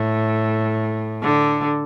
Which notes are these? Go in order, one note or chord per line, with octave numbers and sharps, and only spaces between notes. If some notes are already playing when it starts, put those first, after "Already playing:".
Already playing: A2
D3